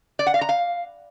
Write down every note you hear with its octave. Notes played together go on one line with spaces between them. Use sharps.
D5
F#5
F5
A#5
F5